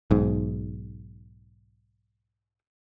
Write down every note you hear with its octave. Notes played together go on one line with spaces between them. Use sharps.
B1 G#2